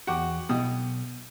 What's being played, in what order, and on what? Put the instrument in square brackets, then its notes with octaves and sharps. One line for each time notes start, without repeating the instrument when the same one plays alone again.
[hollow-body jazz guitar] E2 F#4 [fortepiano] G4 [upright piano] F#5 C#6 D6
[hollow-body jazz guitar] B1 [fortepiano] B2 G4 D#6